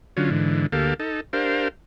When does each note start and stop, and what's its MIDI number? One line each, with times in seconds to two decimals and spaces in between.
0.17 0.30 50
0.17 0.30 54
0.17 0.30 61
0.17 0.30 65
0.30 0.67 44
0.30 0.67 50
0.30 0.67 52
0.72 0.94 38
0.72 0.94 58
0.72 0.94 67
0.72 0.94 69
0.72 0.94 77
0.99 1.21 63
0.99 1.21 69
1.33 1.68 62
1.33 1.68 67
1.33 1.68 70
1.33 1.68 72
1.33 1.68 77